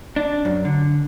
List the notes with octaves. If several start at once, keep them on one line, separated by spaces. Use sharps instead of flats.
D4
F#2
D3